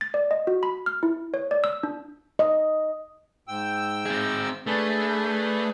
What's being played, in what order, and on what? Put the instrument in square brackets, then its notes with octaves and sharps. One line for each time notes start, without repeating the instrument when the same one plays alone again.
[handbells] A6
D5
D#5
F#4
B5
F6
E4
C#5
D5
E6
D4
[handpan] D#5
[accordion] G#2 G5 E6
[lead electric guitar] C4 G#4
[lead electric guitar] A3 [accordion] D4 G#4 B4